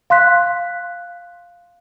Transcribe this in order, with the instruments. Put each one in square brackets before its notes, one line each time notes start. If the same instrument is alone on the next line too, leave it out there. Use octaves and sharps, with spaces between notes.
[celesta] F5 C6 F#6 B6